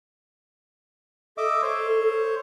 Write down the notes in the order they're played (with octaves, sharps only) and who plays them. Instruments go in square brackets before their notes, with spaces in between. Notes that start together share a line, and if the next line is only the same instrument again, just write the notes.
[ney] A4 [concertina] D#5 E5 D6
[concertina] C5 C#5